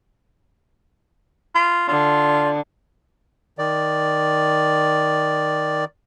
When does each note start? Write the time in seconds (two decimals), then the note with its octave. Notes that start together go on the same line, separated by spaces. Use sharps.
1.55 F4
1.88 D3 F4
3.58 D#3 D5